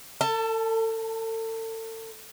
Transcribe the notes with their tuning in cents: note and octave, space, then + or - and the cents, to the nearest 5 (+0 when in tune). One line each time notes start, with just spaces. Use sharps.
A4 +35 A5 +0